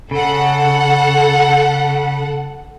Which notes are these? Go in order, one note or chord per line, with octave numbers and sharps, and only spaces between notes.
C#3 A4 F#5